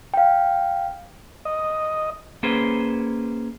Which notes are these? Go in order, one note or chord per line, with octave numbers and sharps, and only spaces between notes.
F5 G5
D#5
A#3 C#4 G#4 B4 C5